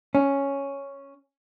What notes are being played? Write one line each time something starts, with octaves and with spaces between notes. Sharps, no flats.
C#4